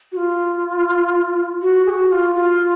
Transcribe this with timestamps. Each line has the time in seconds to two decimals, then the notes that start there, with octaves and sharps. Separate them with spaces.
0.12 F#4
0.17 F4
1.62 F#4
1.86 G#4
1.90 F#4
2.12 F4
2.36 F4